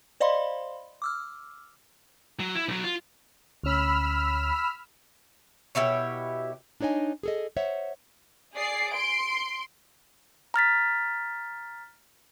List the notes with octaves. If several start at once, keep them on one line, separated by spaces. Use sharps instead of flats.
C5 D5 D#5 F5 B5 C6
D6 E6 F6
F#3
E4
B1 F#3
F4
D2 C#4 B5 E6 F6
B2 E4 G4 C#5
D4 D#4 C#5 D#5 G#5
G#4 A4 D#5
C5 C#5 E5 F#5
G#4 D5 C7
C6 D7
A#5 F6 A6 B6